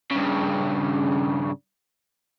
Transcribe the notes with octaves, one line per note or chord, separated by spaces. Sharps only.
G2 C#3